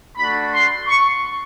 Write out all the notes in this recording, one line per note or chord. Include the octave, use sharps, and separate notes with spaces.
A3 D4 F#4 B5
C6
C#6